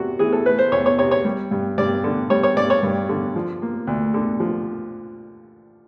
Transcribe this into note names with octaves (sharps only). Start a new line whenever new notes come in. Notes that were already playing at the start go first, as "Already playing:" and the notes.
Already playing: E2 C3 F#4
E3 G#4
A4
A3 B4
C5
E2 C#5
C#5
C3 C#5
C#5
G3
G2
G2 D5
D3
G3 C#5
C#5
G2 D5
C#5
G2
D3
F3
A#3
D2
D3
F3